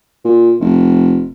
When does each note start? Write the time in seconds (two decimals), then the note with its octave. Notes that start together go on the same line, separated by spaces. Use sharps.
0.25 A#2
0.60 F1